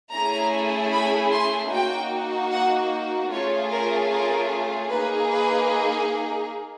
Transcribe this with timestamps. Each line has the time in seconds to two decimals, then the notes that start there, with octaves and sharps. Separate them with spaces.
0.13 A3 C#4 E4 G#4 A#5
0.93 B5
1.32 C6
1.72 A#3 D#4 F#4 G5
2.51 F#5
3.31 A3 C#4 F4 G#4 C#5
3.71 A#4
4.11 A#4
4.90 A#3 D#4 G#4 B4
5.30 B4